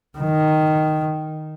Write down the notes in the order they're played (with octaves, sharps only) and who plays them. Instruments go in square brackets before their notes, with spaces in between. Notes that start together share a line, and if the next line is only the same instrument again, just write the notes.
[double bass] D#3